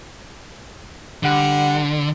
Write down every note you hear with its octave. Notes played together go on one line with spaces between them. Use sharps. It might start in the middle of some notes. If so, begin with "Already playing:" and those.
D3 G3 F#5